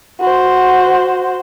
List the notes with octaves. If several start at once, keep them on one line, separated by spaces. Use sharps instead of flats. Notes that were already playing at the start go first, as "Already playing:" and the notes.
F#4 C5